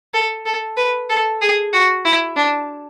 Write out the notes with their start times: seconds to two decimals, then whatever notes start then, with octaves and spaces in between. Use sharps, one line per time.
0.14 A4
0.46 A4
0.77 B4
1.09 A4
1.42 G#4
1.73 F#4
2.05 E4
2.36 D4